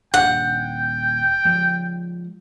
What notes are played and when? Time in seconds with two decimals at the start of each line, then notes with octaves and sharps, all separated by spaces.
0.14 D#1 D4 F#5 G5
1.45 F3 G#3